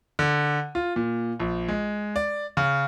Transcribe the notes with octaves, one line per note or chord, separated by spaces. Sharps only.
D3
F4
A#2
A#1
G#3
D5
C#3